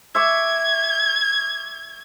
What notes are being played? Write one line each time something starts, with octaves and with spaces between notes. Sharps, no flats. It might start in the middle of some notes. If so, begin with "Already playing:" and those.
E5 C#6 D6 G#6